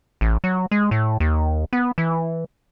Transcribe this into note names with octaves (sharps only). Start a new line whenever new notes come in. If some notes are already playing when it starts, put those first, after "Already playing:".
A1
F#3
G#3
A2
D#2
B3
E3